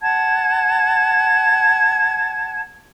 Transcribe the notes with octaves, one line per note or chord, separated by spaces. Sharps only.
F#5 A5 G#6